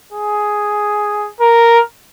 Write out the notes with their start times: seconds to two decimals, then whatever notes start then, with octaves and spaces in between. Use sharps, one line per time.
0.13 G#4
1.40 A#4